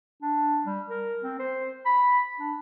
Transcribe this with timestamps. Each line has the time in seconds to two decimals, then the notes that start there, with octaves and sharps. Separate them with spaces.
0.22 D4
0.66 G3
0.90 A#4
1.24 C4
1.39 C5
1.86 B5
2.39 D4